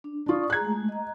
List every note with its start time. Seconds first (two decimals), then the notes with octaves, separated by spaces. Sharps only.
0.04 D4
0.26 D4 F4 D5 C#6 D#6
0.50 G#4 A#5 F#6 G#6
0.61 G#3 A3
0.89 D#5 A#5